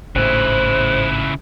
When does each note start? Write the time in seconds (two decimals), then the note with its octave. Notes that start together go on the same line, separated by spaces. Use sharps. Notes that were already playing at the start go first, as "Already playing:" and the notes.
0.15 G#1 A2 C#3 E4 C5 F#6